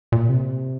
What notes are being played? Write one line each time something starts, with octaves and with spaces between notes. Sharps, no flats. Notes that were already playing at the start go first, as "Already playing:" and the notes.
A#2
C3